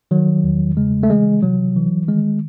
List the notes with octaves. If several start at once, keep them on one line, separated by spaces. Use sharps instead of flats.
D#3 F#3
E2
C#3 G#3
A3
E3 G#3
C3 F#3
E3
D#3 G#3